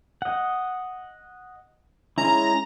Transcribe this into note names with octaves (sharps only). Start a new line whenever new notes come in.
D#5 F#5
G#3 C#4 E4 A#5